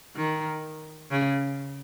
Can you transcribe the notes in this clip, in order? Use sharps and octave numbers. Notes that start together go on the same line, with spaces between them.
D#3
C#3